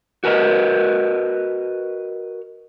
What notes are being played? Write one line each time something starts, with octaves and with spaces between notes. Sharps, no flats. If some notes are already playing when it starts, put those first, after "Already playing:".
F#4 A#4 B4 D#5